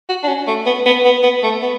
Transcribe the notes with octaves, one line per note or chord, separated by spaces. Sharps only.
F#4
D4
C#4
A3
B3
B3
B3
B3
A3
B3